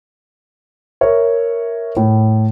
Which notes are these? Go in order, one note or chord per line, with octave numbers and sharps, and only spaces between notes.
A#4 C#5 E5
A2